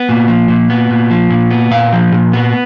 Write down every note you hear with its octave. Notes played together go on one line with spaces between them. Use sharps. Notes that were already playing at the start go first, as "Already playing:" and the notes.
Already playing: B3
A#2
F3
A#2
B3
A#2
F3
A#2
B3
A#2 F5
F3
A#2
B3